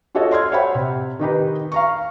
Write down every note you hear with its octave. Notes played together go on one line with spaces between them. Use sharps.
F4 F#4 A4 C#5 D#5
D5 C6 F6 G#6
C5 C#5 E5 F#5 G5 B5
C3
D#3 D#4 G4 B4
F5 A#5 C#6